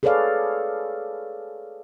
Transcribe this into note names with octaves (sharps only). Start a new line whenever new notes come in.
G#4 A4 B4 C#5 D5 F5